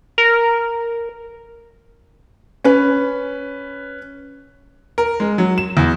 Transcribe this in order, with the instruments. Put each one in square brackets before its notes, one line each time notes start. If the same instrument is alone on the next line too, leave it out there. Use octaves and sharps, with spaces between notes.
[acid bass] A#4
[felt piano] C#4 B4
[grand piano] A#4
G#3
F#3
E7
E2